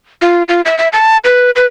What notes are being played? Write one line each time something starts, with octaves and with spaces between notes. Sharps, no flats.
F4
F4
E5
E5
A5
B4
B4